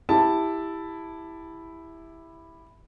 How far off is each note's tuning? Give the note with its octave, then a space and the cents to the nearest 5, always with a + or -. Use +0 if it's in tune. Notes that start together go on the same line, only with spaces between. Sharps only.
E4 +0 G4 +15 A5 +5